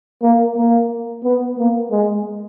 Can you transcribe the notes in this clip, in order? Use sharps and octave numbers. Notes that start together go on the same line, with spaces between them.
A#3
A#3
B3
A#3
G#3